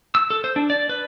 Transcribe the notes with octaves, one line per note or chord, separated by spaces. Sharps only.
E6
A4
C5
D4
D5
B4